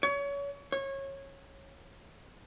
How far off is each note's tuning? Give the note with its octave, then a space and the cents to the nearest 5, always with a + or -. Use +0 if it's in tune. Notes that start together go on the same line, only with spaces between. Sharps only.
C#5 +30
C#5 -20